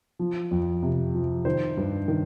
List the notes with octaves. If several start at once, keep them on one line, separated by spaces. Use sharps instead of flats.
F3
F2
C3
F3
D#3 C5
G2
D#3